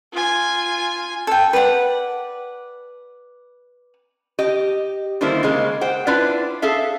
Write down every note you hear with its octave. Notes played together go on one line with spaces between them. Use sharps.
F4 G#5
A4 G5
B4 D5 F#5
G4 D#5
D3 D#3 G3 A#3 E4 C5
C#3 G#3 A#3
C5 F#5 G5
D4 E4 F4 B4 D5
G#4 A4 E5 F5